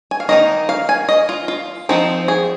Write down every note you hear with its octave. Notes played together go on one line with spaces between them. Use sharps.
G#5
F5
D#3 A#3 D#4 D#5
F5
G#5
D#5
F4
F4
F3 C4 D#4
G#4